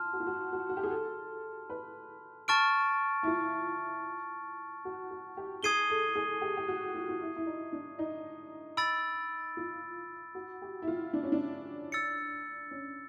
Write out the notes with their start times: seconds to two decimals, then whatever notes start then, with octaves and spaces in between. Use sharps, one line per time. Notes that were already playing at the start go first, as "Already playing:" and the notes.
Already playing: F4 A5 C6 F6
0.13 F#4
0.20 F4
0.27 F#4
0.52 F#4
0.69 F#4
0.77 G4
0.83 G#4
0.91 A4
1.70 B4
2.48 A5 C#6 F6 A6 D7
3.23 E4
3.27 F4
4.85 F#4
5.11 F#4
5.37 G4
5.63 G#4 D#6 G#6 C7 D#7 G7
5.90 A4
6.15 G#4
6.41 G4
6.57 G4
6.68 F#4
6.94 F4
7.09 F4
7.21 E4
7.36 E4
7.46 D#4
7.72 D4
7.99 D#4
8.77 B5 E6 A6 D7
9.57 F4
10.35 F#4
10.62 G4
10.82 E4
10.87 F4
11.13 D4
11.23 C#4
11.32 D4
11.92 E6 A6 C#7
12.71 C#4